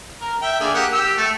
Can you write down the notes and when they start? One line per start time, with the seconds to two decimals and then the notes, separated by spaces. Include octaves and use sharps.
0.21 A#4
0.42 E5 G5
0.60 D3 A#3 G#4
0.74 A#3 G4 F#5
0.93 G4 E6
1.17 A3